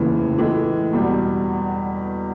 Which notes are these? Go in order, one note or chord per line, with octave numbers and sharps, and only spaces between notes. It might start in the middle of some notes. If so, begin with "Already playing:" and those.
Already playing: F1 D#2 C#3 E3
A2 E3 G#3
E2 B2 G3